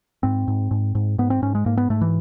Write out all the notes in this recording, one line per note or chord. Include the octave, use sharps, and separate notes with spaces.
G#2 C4
G#2
G#2
G#2
G#2 B3
C4
G#2 C#4
G#3
G#2 A#3
B3
G#2 A3
E3